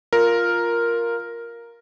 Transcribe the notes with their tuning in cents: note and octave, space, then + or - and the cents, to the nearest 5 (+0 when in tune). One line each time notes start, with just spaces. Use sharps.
F4 +0 A#4 +0